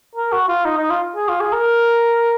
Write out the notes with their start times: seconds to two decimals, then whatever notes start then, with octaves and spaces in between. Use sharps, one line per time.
0.15 A#4
0.32 F#4
0.48 F4
0.65 D#4
0.78 D#4
0.90 F4
1.16 G#4
1.29 F4
1.40 G#4
1.53 A#4